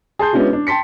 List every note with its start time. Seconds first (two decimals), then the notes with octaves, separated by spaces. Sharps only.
0.19 G#4 A5 C6 G6
0.33 G#3 B3 C#4 D4 E4 F#4
0.53 D4
0.67 G5 A5 C6 B6 C#7